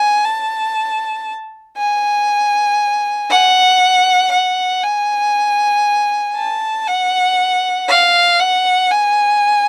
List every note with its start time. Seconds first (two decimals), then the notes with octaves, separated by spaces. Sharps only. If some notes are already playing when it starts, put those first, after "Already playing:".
Already playing: G#5
0.24 A5
1.77 G#5
3.30 F#5
4.32 F#5
4.83 G#5
6.36 A5
6.87 F#5
7.89 F5
8.39 F#5
8.91 G#5